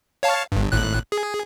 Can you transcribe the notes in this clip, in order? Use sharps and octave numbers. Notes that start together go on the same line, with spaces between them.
C#5 F5 A5
G1 G2
G#1 A2 F#6
G#4